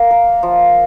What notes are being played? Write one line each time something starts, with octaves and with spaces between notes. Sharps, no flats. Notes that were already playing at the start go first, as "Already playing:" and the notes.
Already playing: A#3 E5
A#4
F3